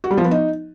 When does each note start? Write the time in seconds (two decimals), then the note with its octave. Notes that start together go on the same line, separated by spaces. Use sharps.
0.04 F#4
0.11 G3
0.18 F3
0.24 B3
0.31 D#4